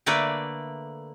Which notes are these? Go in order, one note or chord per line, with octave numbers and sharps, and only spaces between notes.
D3 A3 A#3 B4 D5